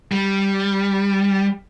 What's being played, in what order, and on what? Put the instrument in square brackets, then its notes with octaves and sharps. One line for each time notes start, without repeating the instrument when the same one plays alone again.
[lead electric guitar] G3